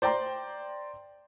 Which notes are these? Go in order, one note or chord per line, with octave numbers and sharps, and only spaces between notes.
C5 D5 G5 A#5 C6